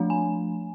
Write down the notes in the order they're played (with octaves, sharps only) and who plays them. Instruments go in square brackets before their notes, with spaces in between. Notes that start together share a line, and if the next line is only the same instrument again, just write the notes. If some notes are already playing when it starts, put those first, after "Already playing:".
Already playing: [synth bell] F3 A3 D4
G#5